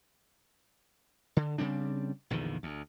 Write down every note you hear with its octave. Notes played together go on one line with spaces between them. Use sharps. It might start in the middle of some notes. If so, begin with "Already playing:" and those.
D3
C#3 G3 C4 D4
A#1 E2 D3 D#3
D2